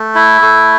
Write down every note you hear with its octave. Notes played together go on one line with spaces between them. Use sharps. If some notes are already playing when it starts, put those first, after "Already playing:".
Already playing: A3
E4
A3